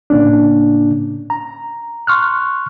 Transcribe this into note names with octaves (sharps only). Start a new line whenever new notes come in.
A2 C#3 A#3 C#4 D4
A#5
C6 C#6 F6 F#6